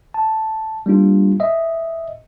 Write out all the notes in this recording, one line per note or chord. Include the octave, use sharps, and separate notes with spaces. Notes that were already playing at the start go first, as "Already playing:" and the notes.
A5
G3 A#3 D4 F4
D#5 E5